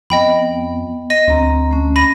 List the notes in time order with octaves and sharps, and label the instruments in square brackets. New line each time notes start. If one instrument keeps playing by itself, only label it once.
[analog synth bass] F2 [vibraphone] B3 [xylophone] D#5 G5 B5
[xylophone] D#5 A#6 D#7
[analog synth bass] D2 [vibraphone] C4 A#5
[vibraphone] A3 C#4
[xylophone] B5 A#6 D#7